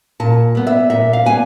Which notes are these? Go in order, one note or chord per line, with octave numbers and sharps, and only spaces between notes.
A#2 A5
G3 B3
E5
A#2 E5
F5
G3 B3 G#5